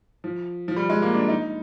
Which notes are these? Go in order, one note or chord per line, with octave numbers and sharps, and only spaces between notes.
F3
F3
G3
G#3
A#3
D4
D#4